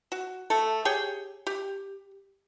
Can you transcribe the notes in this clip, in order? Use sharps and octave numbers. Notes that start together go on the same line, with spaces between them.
F#4
A3 A4
G4 G#4 C#5 G5
G4